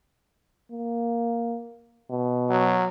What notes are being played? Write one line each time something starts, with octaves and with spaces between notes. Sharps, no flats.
A#3
B2
F#3